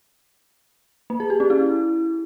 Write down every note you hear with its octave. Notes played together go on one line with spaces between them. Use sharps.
A#3
G#4
G4
C#4
E4